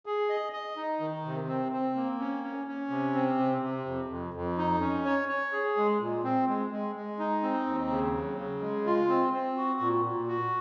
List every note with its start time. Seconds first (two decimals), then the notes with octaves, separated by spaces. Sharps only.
0.06 G#4
0.29 D#5
0.53 D#5
0.76 D#4
1.00 D#3
1.25 C3
1.48 C4
1.72 C4
1.96 A#3
2.19 C#4
2.44 C#4
2.67 C#4
2.90 C3
3.14 C4
3.39 C3
3.62 C3
3.86 F2
4.09 F2
4.34 F2
4.58 D#4
4.80 C#4
5.05 C#5
5.29 C#5
5.53 G#4
5.77 G#3
6.00 A#2
6.24 C4
6.47 G#3
6.71 G#3
6.96 G#3
7.19 D#4
7.43 C4
7.66 D#2
7.90 C#3
8.13 F#3
8.38 C#3
8.61 G#3
8.86 F4
9.09 C4
9.33 C4
9.57 F#4
9.80 A#2
10.05 A#2
10.27 F#4